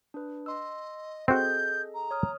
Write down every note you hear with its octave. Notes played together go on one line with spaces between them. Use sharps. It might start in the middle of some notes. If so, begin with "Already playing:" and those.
D4 B4
D#5 C6 E6
C4 F#4 G#4 A4 D#5 G6
A#5
C#5 D#6 F6